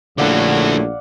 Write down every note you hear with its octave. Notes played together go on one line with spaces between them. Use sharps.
A#1 F#2 A2 D3 A3 D5 F5 F#5